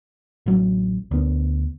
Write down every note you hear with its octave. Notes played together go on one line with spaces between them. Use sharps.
A1 F#3
D2 B3